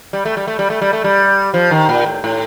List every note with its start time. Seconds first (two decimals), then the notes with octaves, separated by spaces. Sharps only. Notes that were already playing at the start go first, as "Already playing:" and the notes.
0.13 G3
0.25 A3
0.37 G3
0.47 A3
0.59 G3
0.70 A3
0.81 G3
0.93 A3
1.04 G3
1.54 F3
1.71 D#3
1.89 A#2
2.06 A2
2.24 A2